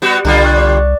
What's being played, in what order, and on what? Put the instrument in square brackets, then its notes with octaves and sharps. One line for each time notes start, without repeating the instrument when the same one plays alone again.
[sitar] G3 B3 F#4
[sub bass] C2 [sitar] D3 G3 F4
[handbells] C#6 F#6
D5